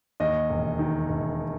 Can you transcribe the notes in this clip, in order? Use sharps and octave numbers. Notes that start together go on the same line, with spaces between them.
D#2 D#5
E1
D#3
E1